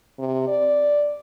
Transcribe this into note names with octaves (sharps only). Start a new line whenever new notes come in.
C3
D5